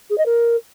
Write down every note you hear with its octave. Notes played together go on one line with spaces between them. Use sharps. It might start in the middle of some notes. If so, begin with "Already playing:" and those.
G#4
D#5
A#4